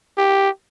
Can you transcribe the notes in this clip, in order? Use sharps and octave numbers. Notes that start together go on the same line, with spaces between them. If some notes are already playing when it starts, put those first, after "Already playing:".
G4